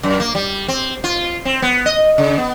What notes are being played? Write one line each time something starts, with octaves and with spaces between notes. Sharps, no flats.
F#2
A#3
G3
C4
F4
C4
B3
D#5
C#3
B3